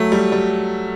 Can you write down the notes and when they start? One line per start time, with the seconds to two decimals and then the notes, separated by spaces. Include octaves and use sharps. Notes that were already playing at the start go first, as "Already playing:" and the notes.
Already playing: F#3 A3
0.12 G3
0.32 G3